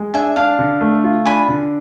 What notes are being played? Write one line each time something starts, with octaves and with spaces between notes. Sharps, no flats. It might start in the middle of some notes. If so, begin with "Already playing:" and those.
Already playing: G#3
D4 E5 G#5
D4 F5 A5
D3
A3
F4
D4 G#5 B5
D3